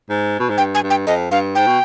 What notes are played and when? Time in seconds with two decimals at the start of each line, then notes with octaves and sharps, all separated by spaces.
0.09 G#2
0.39 B2
0.49 G#2
0.58 G2 G5
0.75 G#5
0.83 G2
0.90 G5
1.07 F2 D#5
1.31 G2 F5
1.55 G#2 G5
1.67 B2